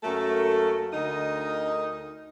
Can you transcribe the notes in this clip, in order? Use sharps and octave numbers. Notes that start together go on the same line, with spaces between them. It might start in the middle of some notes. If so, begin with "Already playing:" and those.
F#2 F#3 A3 A#3 A4 A#4
D2 D3 D#4 A#4 D#5